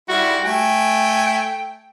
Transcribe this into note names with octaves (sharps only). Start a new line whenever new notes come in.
G3 E4 F#4
A3 G5 G#5